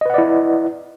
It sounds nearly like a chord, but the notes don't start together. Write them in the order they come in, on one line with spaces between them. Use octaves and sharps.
D#5 B4 F#5 D5 E4